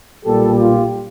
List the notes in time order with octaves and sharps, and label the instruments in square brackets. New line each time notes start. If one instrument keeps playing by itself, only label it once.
[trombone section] B1 A#2 G3 G4 A4
F4 G4